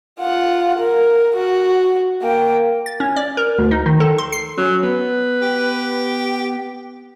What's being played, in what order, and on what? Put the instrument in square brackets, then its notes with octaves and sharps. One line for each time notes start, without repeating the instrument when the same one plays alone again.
[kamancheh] F4 F#5
A#4
F#4
A#3 G5
[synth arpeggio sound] A6
C#4
D5
A#4
D2
D#4
D#3
A4
C6
C7
[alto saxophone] F#3 [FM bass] C#4
[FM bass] B3 [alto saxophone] B4
[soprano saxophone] G4